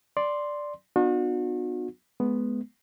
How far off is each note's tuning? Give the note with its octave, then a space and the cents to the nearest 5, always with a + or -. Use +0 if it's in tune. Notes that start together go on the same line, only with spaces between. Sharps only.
D5 +0 C6 +0
B3 +10 D4 +45 F#4 -40
G#3 +30 B3 +0